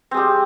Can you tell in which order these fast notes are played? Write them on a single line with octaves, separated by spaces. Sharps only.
C4 G#3 G3